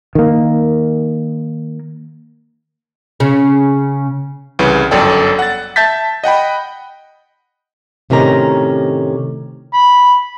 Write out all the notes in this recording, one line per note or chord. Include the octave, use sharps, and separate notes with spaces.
D#3 A#3
C#3
C2 C#3 E3 B4
G1 F#2 A4 D5 G5
F#5 A6
E5 A5 G6 A6 B6
D#5 F#5 G5 B5
A2 C3 D#3 C#4 A#5
B5